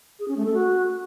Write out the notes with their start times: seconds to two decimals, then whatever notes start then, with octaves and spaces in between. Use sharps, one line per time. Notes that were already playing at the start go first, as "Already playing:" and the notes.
0.19 G#4
0.28 C#4
0.37 A3
0.45 A4
0.54 F#4